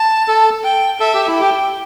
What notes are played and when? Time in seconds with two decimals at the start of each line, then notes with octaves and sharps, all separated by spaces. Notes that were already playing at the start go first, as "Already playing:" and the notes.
Already playing: A5
0.28 A4
0.64 G5
1.00 A4 E5
1.14 G4
1.27 E4
1.36 G4 G5